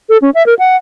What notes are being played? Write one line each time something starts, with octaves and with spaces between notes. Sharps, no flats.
A4
C#4
E5
A#4
F#5